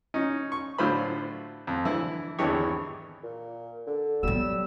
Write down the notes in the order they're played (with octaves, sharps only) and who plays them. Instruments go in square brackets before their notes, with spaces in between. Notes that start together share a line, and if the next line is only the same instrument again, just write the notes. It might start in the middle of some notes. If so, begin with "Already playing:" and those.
[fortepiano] C#4 D#4
C#6
A2 D3 F#3 F4 C5 B5
F2
D3 E3 E4
G#1 E2 D3 E3 G4 C#5
[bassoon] A#2
D3
[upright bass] F#3 B3 [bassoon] G3 [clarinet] E6